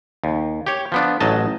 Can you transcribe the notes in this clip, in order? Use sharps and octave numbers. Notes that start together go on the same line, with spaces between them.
D#2
G4 C#5
F3 B3 D4
A1 F#3 D#5 A5